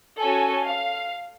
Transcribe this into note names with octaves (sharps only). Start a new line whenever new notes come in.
C#4 F#4 A4 G#5
F5